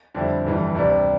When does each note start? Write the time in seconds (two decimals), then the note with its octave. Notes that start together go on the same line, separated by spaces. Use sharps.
0.14 F2 D3 G3 C4 E4
0.45 G1 F2 E3 G3
0.75 D2 C3 G3 D4